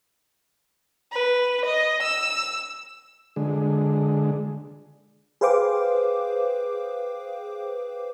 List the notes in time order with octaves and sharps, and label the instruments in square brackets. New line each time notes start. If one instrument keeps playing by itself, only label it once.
[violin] B4
D#5
E6
[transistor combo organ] D3 G#3
[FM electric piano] G#4 B4 C5 F5 G5 D6